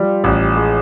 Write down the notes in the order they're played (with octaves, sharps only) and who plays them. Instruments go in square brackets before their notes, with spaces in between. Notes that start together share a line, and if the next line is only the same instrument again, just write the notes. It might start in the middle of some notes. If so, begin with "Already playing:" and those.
Already playing: [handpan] F3 F4 [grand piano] G3
[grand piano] A1
G#3